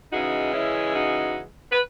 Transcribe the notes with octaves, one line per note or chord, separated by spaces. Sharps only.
C#3 E3 G#3 D#4 F#4
C#4 E4
D#4 F#4
B4